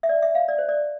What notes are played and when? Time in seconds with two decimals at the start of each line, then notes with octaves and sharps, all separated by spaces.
0.03 E5
0.09 D5
0.22 E5
0.35 F5
0.48 D5
0.59 C5
0.69 D5